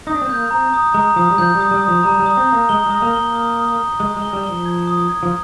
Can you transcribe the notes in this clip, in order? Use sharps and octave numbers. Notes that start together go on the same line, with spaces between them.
D#4 D#6
D4
C4
A#3 G6
C4 A#5
D#6
G#3 A#5
F3 D#6
G3
F3 G6
G3
D#6
G3
D#6
F3
G3 A#5
G3
D#6
C4
A#5
A#3
G#3 G7
G#3 D#6
A#3
G7
A#3
D#6
D#6
G7
G#3 D#6
G#3
G7
G3
G7
F3
G#6
D#6
G#6
F3